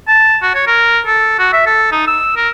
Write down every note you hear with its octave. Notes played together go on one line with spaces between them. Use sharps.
A5
F#4
C#5
A#4
A4
F#4
E5
A4
D#4
E6
A#4